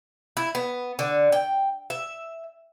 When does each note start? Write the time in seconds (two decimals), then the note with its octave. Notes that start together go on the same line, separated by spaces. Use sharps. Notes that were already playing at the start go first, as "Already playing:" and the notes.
0.37 E4
0.55 B3
0.99 D3
1.32 G5
1.90 E5